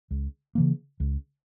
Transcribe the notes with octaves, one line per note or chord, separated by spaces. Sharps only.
C#2
C#3 E3 A#3
C#2